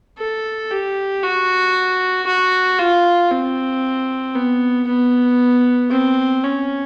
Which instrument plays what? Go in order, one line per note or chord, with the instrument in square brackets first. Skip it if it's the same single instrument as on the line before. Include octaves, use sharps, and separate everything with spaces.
[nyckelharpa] A4
G4
F#4
F#4
F4
C4
B3
B3
C4
C#4